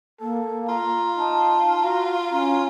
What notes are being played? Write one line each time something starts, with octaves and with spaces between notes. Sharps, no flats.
A#3 A4
F4 A#5
D#4 A5
F#4 A#5
C#4 A#5